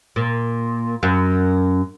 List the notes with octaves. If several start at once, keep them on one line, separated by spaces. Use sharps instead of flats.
A#2
F#2